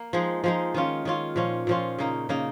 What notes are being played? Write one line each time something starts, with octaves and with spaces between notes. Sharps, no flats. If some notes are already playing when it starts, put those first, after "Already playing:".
Already playing: A#3
F3 G#3 D#4
F3 G#3 D#4
D#3 C#4 F4
D#3 C#4 F4
A#2 F3 C#4 F4
A#2 F3 C#4 F4
C#3 A#3 D#4
C#3 A#3 D#4